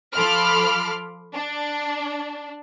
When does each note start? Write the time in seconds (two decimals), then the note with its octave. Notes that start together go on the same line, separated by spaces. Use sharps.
0.15 F3 A4 B5 C6 D6 F6
1.34 D4